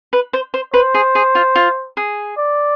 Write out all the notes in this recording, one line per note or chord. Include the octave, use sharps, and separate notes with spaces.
B4
C5
C5
B4 C5
G#4
G#4
F4
F4
G#4
D5